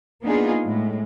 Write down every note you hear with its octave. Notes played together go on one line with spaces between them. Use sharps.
A#3 B3 D4 D#4 F4 G#4
A2 G#3